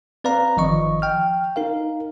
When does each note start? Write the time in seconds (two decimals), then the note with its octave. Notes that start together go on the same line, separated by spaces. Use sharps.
0.24 C4 B4 D5 F5 A#5
0.57 G1 D#3 F3 D#5 C#6
1.02 G5 F6
1.56 D#4 A#4 F5